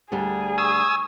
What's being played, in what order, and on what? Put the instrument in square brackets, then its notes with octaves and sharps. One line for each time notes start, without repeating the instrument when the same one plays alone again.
[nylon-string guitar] D2 D3 G3 [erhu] G#4
[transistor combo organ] G#5 D#6 E6 [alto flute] C#6